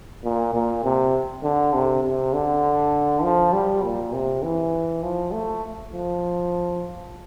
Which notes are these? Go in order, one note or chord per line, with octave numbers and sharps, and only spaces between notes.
A#2
A#2
C3
D3
C3
C3
D3
F3
G3
A#2
C3
E3
F3
A3
F3